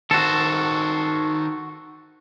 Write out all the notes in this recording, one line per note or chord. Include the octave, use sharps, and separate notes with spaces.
D#3 F#4 A4 C5